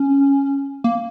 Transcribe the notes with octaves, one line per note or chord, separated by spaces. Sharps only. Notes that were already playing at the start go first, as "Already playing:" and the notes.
Already playing: C#4
A#3